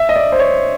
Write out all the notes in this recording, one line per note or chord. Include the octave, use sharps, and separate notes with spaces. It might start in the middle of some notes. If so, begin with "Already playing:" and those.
Already playing: E5
D#5
D5
C5
C#5